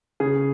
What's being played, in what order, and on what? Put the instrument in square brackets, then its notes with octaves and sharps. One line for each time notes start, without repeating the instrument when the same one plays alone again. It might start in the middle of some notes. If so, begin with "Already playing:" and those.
[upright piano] C#3 G#4